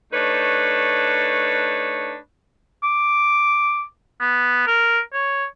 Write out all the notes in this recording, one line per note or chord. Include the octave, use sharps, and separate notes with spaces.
A3 D4 D#4 B4 C#5
D6
B3
A#4
C#5